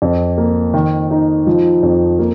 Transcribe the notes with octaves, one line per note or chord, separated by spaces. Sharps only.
F2
A#3
D#3
D#4
F3
F2
A#3